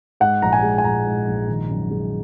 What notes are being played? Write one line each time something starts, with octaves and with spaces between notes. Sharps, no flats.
G#2 F#5
A#1 A#5
G#5
G#3
G#5
A#1 A#5
G#2
A#1
D#3
F#2
G#3